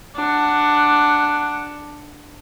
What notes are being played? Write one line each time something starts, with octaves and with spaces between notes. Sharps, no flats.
D4 F#5